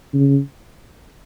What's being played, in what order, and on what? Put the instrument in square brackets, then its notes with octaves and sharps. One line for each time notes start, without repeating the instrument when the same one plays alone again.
[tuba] C#3